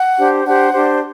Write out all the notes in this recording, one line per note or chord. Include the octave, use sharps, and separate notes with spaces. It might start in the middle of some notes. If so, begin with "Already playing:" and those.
Already playing: F#5
D4 G4 C5
D4 G4 C5 F#5
D4 G4 C5